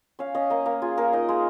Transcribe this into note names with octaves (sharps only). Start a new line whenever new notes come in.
C#4 F5
C#4 D#5
A#3 D#5
A#3
F4 G#4
A#3 A#4
D#4 D#5
G#3